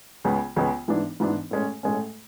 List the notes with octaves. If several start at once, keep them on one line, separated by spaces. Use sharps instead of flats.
C#2 C#3 G#3 B3
C#2 C#3 G#3 B3
G#2 E3 B3 D4
G#2 E3 B3 D4
A2 G#3 C#4
A2 G#3 C#4